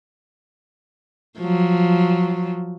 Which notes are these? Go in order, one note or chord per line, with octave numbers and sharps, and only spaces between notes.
F3 F#3